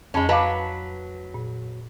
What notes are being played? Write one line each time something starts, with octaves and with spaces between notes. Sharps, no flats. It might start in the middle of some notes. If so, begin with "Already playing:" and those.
F2 G#3 C#4 A5 B5
F#3 B4 D#5 F5 A5 D6
A#2